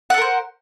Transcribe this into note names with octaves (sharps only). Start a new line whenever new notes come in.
A4 A#4 C5 F#5